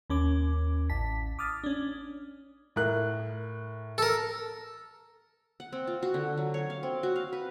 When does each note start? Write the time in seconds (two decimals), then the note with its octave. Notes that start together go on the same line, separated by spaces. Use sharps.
0.10 D#2 C#4 D6
0.89 A1 A5 B6
1.39 D6 D#6 F6 A6
1.64 C#4 D4
2.76 A2 A#4 F#6
3.98 A4 A#4
5.60 F#5
5.73 C4
5.87 F4
6.03 F#4
6.14 D3
6.38 F#3
6.54 C#5
6.70 F5
6.83 C4
7.03 F#4
7.16 F5
7.33 B4